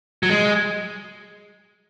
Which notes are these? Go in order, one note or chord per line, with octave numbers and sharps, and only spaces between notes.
F#3
G#3